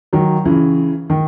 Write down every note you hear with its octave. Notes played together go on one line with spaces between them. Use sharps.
D#3 F#3
C#3 E3
D#3